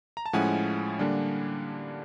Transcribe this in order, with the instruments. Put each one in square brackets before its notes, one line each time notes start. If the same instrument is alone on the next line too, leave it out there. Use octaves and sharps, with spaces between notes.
[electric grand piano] A#5
A5
A2 F3 G#3 C#4 E4 F#5 G#5
D3 G3 A#3 D4